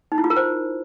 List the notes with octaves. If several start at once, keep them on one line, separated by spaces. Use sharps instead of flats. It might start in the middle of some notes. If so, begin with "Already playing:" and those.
D#4
E4
F4
A#4
C5